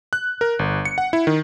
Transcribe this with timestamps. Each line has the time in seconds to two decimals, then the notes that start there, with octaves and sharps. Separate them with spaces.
0.13 F#6
0.41 A#4
0.59 G1
0.85 C#7
0.98 F#5
1.13 E4
1.27 D#3